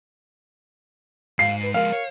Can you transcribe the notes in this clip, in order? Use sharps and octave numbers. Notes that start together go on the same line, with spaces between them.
G#2 F5 C7
B4
F3 G#3 A#4 F5
C#5